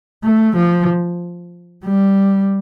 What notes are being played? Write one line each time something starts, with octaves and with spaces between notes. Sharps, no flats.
A3
F3
G3